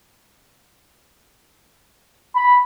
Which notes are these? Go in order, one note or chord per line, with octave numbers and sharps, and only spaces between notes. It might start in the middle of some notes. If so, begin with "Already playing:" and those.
B5